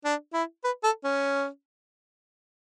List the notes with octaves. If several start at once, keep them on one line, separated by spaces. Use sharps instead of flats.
D4
E4
B4
A4
C#4